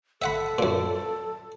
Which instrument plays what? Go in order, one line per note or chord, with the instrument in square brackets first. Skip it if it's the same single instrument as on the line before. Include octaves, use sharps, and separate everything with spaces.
[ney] A4 [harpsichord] E5 F#5 B5
[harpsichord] F#2 A#2